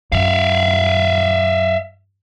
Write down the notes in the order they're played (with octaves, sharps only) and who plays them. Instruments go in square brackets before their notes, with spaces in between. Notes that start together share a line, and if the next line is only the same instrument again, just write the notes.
[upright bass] F#2 [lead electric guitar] E5 F5